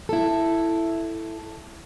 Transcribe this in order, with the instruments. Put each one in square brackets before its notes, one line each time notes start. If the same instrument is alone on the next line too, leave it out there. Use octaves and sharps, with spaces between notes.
[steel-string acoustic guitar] E4 A4